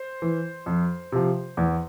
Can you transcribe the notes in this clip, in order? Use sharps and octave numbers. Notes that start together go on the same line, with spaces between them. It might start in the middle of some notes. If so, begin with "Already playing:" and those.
Already playing: C5
E3
F2
C3 F3
E2